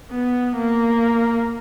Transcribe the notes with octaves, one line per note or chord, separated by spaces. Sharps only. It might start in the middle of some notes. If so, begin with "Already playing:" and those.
B3
A#3